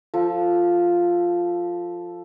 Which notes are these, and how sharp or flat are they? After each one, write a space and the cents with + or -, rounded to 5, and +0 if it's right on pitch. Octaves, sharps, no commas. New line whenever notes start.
F3 +0 A4 +10